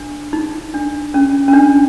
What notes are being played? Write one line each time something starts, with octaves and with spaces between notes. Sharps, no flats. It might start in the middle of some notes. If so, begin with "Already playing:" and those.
Already playing: D4
D#4
D4
C#4
C#4
D4